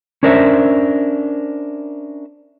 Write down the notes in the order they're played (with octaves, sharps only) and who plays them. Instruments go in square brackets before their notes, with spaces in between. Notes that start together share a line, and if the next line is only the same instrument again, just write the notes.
[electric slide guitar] C#4 D4 A#4 C5 D5 E5